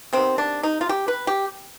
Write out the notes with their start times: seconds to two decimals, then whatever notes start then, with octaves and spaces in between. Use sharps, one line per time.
0.13 C3 D#3 B3 C4
0.38 D4
0.63 D#4
0.81 F4
0.89 G4
1.08 B4
1.27 G4